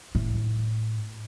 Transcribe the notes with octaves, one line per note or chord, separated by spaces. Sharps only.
A2